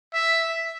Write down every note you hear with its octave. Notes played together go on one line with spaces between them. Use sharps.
E5